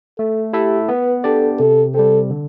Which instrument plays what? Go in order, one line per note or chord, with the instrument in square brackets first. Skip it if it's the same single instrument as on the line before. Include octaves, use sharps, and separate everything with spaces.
[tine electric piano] A3 [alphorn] A4
[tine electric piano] E4 A4 E5 [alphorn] G4
[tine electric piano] B3 [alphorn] B4
[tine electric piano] D4 G4 D5 [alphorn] A4
[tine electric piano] C3 [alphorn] A4
[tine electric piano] G3 C4 [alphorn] A4
[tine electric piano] D3